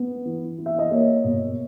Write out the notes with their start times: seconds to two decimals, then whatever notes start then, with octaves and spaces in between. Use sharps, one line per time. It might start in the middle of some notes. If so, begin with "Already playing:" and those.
Already playing: B3
0.25 E3
0.58 E3
0.66 E5
0.79 D#5
0.91 A#3 C#5
1.24 B2